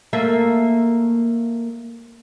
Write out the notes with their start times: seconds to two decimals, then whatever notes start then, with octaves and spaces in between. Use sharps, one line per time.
0.13 A3 A#3 E5